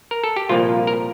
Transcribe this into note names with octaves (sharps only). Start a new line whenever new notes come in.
A#4
A4
G4
C2 A#2 F3 A#3 F4
A#4